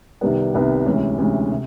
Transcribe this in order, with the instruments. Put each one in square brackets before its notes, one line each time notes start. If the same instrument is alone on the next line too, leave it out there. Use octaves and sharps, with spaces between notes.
[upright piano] C2 C3 D#3 G3 B3
C2 C3 D#3 G3 B3
D2 C3 E3 G#3 C#4
D2 C3 E3 G#3 C#4
C3